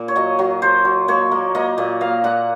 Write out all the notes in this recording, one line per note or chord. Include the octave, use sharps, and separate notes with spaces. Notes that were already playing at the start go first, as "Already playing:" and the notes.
Already playing: A#2 A#3
C#5
F#3 D#5
F#3
F#3 C5
F#3
A#3 C#5
A#3
A#3 D#5
A#2
A#3 F5
A#2 F#5